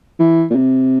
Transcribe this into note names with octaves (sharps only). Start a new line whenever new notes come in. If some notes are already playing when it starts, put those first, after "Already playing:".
E3
A#2
C3